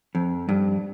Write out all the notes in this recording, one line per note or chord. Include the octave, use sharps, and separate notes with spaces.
F2
G2